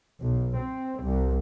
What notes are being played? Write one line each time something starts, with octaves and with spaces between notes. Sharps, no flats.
B1
C4
C2